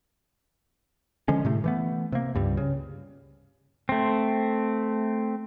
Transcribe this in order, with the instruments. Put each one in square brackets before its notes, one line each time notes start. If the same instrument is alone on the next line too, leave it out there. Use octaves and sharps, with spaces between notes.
[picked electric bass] D3 F3 G#3 C#4
A2 C3 A3
E3 A3 B3
C3 A#3
C#2 G2 G3
C#3
[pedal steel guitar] A3 C4